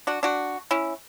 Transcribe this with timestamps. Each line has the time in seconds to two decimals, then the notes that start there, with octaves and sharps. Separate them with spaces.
0.07 D4 F#4
0.23 D4 F#4
0.71 C#4 E4